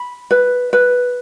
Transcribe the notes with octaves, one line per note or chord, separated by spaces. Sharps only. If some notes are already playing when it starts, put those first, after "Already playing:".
Already playing: B5
B4
B4